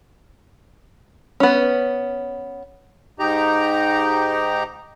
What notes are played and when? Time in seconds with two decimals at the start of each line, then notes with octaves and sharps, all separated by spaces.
1.40 B3 C#4
3.19 G#2 D#4 G4 A#5